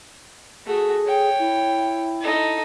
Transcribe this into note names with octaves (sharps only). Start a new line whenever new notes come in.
A3 F#4 G#4
C#5 G5
E4
D#4 A4